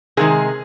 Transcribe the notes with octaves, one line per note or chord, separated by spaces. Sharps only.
C3 D#3 G#3 G#4